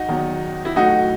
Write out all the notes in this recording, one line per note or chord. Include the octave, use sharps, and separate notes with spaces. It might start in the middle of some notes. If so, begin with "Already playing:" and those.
Already playing: D#4 F#4
E2 D#3 F#3
E4
A2 F#3 A3 D#4 F#4